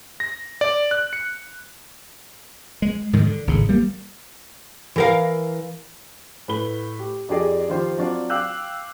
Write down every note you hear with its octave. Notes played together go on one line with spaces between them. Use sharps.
A#6
D5
F#6
C#7
G#3
G#2 D#3 G#3
D3
G#1 A2 C#3
G3 A#3
E3 A#4 F5
A2 B4 B5 G7
G4
F2 D4 G4 G#4 D5 D#5
D#3 F3 F4 G4 C5
F#3 C4 D4 F4 D5
F5 G5 D6 E6 F#6 G6